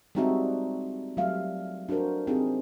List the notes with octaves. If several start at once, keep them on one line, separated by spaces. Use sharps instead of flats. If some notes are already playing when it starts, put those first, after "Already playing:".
G3 G#3 C4 D#4 F#4 E5
F#3 G3 A3 F4 E5 F5
D4 F#4 A4 A#4 C5
C4 D#4 F4 G4 G#4